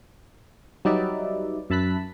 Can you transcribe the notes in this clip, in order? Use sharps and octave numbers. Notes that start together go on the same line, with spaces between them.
F#3 G3 D#4 B4 D5 E5
F#2 E5 A5 B5 F#6 B6